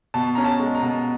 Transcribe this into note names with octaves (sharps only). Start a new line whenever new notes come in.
B2 A5
C#4 A#5
A5
G#3
A#5
B2